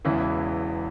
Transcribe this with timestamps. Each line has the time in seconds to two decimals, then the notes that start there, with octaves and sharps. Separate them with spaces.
0.05 E1 E2 C#3 E3 E4